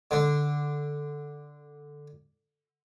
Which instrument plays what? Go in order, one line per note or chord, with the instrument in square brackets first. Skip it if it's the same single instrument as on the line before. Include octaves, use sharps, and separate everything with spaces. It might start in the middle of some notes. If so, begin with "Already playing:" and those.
[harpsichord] D3 D4